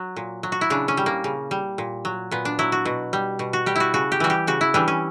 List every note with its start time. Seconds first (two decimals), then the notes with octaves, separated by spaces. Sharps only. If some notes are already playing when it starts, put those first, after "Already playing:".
Already playing: F#3
0.16 A#2
0.43 F#3
0.52 F#4
0.61 E4
0.70 C#3 D4
0.88 C#4
0.97 G3
1.06 A#3
1.24 C#3
1.51 G3
1.78 A#2
2.05 F#3
2.31 A#2 B3
2.45 D4
2.59 F#3 E4
2.72 F#4
2.85 B2
3.13 G3
3.39 B2
3.53 F#4
3.66 G3 G4
3.76 E4 F#4
3.94 C#3 F#4
4.12 G4
4.20 E3 G3 F#4
4.30 G4
4.47 C#3 F#4
4.61 E4
4.74 E3 G3 D4
4.88 C#4